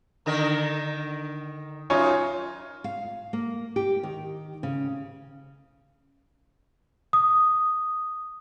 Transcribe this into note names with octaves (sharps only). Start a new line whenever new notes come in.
D3 D#3 A#4
F#2 D#4 F4 C#5 G#5
F5
A#3
G4
D#3
C#3
D#6